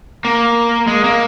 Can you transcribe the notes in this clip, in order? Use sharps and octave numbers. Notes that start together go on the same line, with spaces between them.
A#3
G#3
A#3